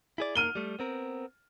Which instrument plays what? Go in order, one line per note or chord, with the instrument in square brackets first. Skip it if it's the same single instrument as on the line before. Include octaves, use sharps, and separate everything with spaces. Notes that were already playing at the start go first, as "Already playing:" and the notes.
[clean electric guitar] E4 G#4 D5
[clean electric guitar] A#3 A#4 [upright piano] F6 D#7 G7
[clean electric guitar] G3 A3
B3 C4 A#4